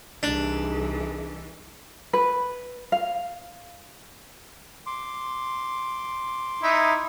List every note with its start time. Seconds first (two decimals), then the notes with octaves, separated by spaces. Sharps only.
0.23 C2 E3 D4 D#4 G#4
2.13 B4
2.92 F5
4.86 C6 D6
6.63 D#4 E4